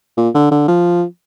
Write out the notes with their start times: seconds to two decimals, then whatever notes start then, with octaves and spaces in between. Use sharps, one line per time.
0.18 A#2
0.35 D3
0.52 D3
0.68 F3